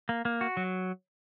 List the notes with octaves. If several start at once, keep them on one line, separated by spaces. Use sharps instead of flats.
A#3
A#3
F#4
F#3